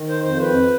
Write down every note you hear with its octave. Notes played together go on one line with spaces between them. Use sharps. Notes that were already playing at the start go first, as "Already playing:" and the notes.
Already playing: D#3
C5
F2 C5
B4